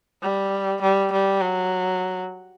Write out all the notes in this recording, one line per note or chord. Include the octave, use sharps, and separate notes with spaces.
G3
G3
G3
F#3